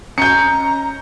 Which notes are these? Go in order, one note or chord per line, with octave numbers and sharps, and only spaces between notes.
C#4 D#5 A#5 G6 C#7